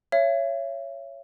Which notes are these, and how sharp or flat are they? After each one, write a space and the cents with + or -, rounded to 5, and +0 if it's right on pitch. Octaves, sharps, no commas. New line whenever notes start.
C#5 +0 E5 +40